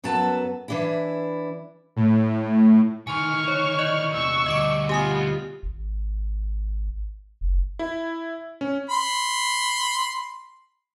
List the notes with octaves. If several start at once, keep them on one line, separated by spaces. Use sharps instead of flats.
F#2 F#3 B3 A4 A5
E3 D4 E4
A2
D#3 E3 G#5 C6 C#6 F6
C#5
D5 D#5 F#6
E2 C3 C#6 E6
D2 G3 D#5 D6 D7
B3 F4 G4 G#5 D#6
G#1
F#1
E4
C#4
B5 C6